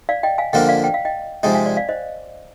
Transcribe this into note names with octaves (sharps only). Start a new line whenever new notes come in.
D5 F5
D#5 G5
F5 G#5
D3 F3 A#3 D4 F4 D#5 G5
D5 F5
G5
F5
D#5 G5
C3 F3 G#3 D#4 D#5 G5
F5 G#5
D5 F5
D5 F5
C5 D#5